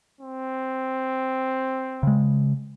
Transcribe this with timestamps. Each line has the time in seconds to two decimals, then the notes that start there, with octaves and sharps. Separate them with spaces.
0.21 C4
2.03 C#3 G#3